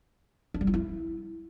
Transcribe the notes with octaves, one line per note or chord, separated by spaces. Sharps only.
D4
G3
F4
E4